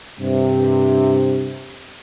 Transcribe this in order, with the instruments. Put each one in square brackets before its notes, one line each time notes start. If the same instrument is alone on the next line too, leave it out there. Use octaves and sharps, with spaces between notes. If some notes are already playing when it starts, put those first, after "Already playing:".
[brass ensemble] G2 C3